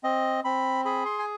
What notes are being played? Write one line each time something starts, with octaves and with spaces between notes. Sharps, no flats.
C4 D#5
C4 B5
G#4 B5
C6
G#5